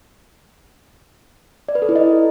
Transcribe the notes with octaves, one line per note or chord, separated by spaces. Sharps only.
D5
B4
A4
E4
D#5